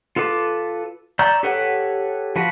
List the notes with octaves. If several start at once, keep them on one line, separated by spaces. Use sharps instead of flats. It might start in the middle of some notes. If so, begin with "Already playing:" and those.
F4 A4 B4 D6
D5 A#5 C#6 E6 G6
G4 A4 B4 C#5 F#5
F3 F#4 B4